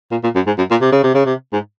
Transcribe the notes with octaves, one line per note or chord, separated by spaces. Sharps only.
A#2
A#2
F#2
G#2
F#2
A#2
C3
C#3
C3
C#3
C3
G#2